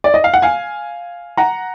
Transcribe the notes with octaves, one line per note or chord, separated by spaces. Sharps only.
D5
D#5
F5
F#5
F5 G#5
F#5 A#5